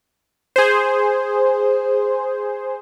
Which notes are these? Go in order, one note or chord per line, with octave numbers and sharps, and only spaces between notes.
G#4 C5